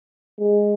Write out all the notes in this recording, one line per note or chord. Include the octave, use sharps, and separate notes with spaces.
G#3